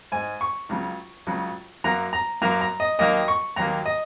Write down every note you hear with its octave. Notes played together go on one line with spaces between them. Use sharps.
G#2 G#3 G#5
C#6
C#2 C#3 F#3
C#2 C#3 F#3
F#2 F#3 A#3 A#5
A#5
F#2 F#3 A#3 A#5
A#5
D#5
D#2 D#3 F#3 A#3 D#5
C#6
D#2 D#3 F#3 A#3 A#5
D#5